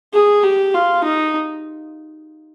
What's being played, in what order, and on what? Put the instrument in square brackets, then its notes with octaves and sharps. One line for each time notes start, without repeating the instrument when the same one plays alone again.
[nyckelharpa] G#4
G4
F4
D#4